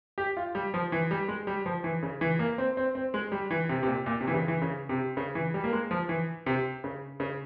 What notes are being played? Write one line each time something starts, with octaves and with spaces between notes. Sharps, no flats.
G4
F4
G3
F3
E3
G3
G#3
G3
F3
E3
C#3
E3
A#3
C4
C4
C4
G#3
G3
E3
C3
C3
A#2
A#2
C3
E3
C#3
E3
C#3
C3
C#3
E3
G3
A#3
G#3
F3
E3
C3
C#3
C#3